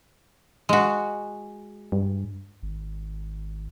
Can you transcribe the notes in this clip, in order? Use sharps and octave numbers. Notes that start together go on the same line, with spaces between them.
G#3 F#4
G2
G#1